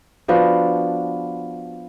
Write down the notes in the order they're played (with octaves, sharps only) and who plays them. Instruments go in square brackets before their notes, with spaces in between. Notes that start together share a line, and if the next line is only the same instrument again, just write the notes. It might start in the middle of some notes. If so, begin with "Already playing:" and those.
[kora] F3 B3 D4 F#4